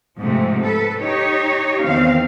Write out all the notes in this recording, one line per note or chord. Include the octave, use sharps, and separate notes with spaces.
G#2 C3 F3 A3
A4 B4
D#4 G4 C#5
E2 D#3 C4 F5